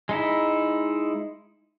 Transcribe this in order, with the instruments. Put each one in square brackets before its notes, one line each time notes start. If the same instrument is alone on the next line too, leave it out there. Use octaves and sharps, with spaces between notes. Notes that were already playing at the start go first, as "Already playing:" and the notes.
[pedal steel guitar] G#3 D#4 E4